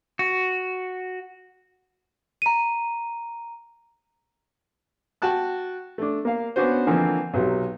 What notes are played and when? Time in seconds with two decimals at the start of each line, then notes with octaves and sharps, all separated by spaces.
0.19 F#4
2.42 A#5 D#7
5.22 F#4 G5 A5 F#6
5.98 A3 D4
6.25 A#3 F5
6.56 B3 C#4 D4 F#4 C5
6.87 D3 E3 F3 A#3 C4
7.34 B1 C3 F#3